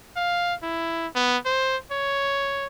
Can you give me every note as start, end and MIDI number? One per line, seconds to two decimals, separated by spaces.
0.16 0.54 77
0.63 1.07 64
1.15 1.37 59
1.46 1.77 72
1.92 2.67 73